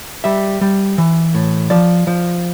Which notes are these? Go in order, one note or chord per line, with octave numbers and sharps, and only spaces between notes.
G3 E5
G3
E3
A2
F3 D5
F3